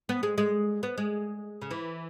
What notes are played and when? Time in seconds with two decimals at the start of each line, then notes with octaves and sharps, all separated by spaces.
0.09 B3
0.23 G#3
0.38 G#3
0.83 B3
0.98 G#3
1.62 C#3
1.71 E3